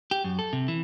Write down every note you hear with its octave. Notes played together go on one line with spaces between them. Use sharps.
G4
F#2
A4
C3
E3